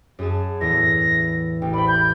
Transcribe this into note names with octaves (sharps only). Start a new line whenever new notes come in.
F#2 G#4 A5
E2 A2 A#6
A1 G5
C5 D5 B5
G6